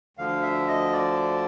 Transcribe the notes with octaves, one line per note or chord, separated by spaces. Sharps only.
D2 D3 F3 F5
E5
D#5
D5